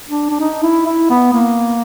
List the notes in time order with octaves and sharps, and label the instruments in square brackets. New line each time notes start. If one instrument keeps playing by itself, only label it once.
[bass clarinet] D4
D4
D#4
E4
E4
B3
A#3